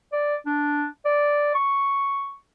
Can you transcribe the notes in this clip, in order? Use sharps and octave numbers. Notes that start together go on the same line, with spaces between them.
D5
D4
D5
C#6